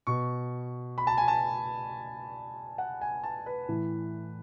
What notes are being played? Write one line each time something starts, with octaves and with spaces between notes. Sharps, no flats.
B2 C#6
B5
A5
G#5
A5
F#5
G#5
A5
B4
A2 E3